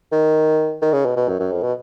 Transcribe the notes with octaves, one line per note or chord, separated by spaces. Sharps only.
D#3
D#3
C#3
B2
B2
F#2
F#2
F2
B2